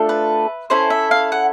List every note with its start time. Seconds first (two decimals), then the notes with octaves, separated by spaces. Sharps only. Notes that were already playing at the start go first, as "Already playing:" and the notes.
Already playing: A3 D4 F4 A4
0.09 B4
0.70 C#4 E4 A4 C5
0.90 E5
1.11 F5
1.32 F#5